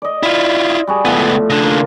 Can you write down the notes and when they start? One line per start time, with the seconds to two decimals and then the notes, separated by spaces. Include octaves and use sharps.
0.02 D5 D#5
0.23 E4 F4
0.87 G3 F#4 G#4
1.05 C#2 A2 F3 B3
1.50 C#3 D4
1.63 A#3 F4